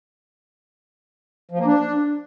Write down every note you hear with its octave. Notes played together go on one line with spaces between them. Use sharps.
F3
A#3
D4